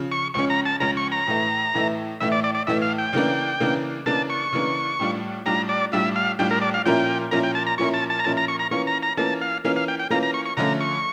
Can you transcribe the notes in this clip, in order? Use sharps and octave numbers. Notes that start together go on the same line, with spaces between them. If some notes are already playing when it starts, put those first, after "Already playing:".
Already playing: C#3 F3
C#6
C#2 C#3 F3 C#4 C#6
A#5
A5
C#2 C#3 F3 C#4 A#5
C#6
A#5
A2 E3 A3 E4
A2 E3 A3 E4
A2 E3 A3 E4 E5
D5
D5
D5
A2 E3 A3 E4 E5
F5
G5
C#3 E3 A#3 D4
C#3 E3 A#3 D4
C#3 E3 A#3 D4 A5
C#6
C#3 E3 A#3 D4
A2 G3 D4 F4
A2 G3 D4 F4 A#5
D5
A2 G3 D4 F4 E5
F5
A2 G3 D4 F4 G5
A#4
D5
F5
A#2 F3 C#4 E4 A#4 G5
A#2 F3 C#4 E4 A#4 A#5
G5
A5
A#5
A#2 F3 C#4 E4 A#4 C#6
A5
A5
A#5
A#2 F3 C#4 E4 A#4 A5
A#5
C#6
A#5
E3 A#3 C#4 F4 C#6
A#5
A#5
E3 A#3 C#4 F4 A5
F5
E3 A#3 C#4 F4 F5
F5
G5
G5
E3 A#3 C#4 F4 A#5
A#5
C#6
C#6
D3 F3 A3 C#4 F4 A#5
C#6